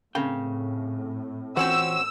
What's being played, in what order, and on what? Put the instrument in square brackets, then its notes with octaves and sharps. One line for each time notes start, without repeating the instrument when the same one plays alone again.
[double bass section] A2 [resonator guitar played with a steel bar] C#3 [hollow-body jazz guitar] C4 A#4 G5
[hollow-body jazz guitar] E3 F4 C5 [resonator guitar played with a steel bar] C4 C#4 F#4 [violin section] E6